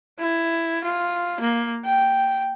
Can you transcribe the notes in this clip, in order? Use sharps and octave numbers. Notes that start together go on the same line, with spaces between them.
E4
F4
A#3
G5